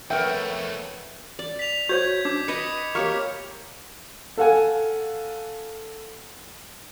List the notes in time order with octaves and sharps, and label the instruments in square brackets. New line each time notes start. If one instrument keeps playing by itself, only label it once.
[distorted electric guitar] F2 A3 [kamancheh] B3 [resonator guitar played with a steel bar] A#4 C#5 E5 [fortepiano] G5
[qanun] D5
[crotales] B6 F7
[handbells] F#4 C5 C#5 [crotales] G6 G#6
[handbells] D4 [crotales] D6
[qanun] B4 D#5 [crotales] C#7
[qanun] A#3 G4 C#5 [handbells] C#6 F6 C#7
[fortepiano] A4 F5 F#5 G#5